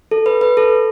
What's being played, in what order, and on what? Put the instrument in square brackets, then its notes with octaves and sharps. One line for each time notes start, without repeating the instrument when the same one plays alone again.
[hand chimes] A4
B4
B4
A4